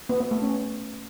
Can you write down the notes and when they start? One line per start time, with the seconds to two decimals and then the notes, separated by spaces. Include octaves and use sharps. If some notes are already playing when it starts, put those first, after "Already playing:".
0.09 B3
0.20 B3
0.31 A3
0.42 C#4